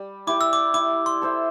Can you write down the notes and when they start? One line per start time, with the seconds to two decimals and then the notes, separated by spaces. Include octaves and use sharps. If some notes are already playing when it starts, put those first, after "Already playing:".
Already playing: G3
0.27 E4 G4 D5 D6
0.41 E6
0.53 D6
0.74 E4 D6
1.06 C6
1.22 A4 C5 E5